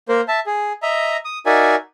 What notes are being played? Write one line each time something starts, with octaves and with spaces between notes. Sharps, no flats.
A#3 A#4 C5
E5 A5
G#4
D#5 E5 A#5
D#6
D#4 F#4 A#4 D5 E5 G#5